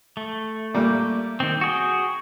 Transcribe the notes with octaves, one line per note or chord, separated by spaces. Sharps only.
A3
A#2 G3 A#3
D#3 C4
F#4 G#4 G5